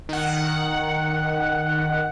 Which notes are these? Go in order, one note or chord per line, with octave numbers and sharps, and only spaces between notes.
D#3 F#5